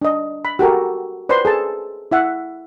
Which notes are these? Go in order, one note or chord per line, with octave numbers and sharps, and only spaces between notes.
D4 D#5
B5
F#4 G4 A4 A#4
B4 C5 D5 B5 C6
G#4 A4 A5
E4 E5 F#5